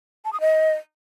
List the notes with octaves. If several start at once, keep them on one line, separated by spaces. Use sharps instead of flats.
A5
D#6
D#5